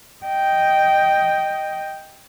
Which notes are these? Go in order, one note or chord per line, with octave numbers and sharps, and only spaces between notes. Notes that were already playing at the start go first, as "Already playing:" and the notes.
D#5 G5